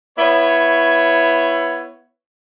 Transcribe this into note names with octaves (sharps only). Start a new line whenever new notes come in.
B3 E4 C#5